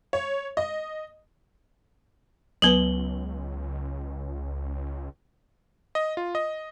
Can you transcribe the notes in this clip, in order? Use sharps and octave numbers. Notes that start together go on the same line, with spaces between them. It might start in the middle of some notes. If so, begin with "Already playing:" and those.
C#5
D#5
C#2 F#3 B3 B4 F#7 G7
D#5
F4
D#5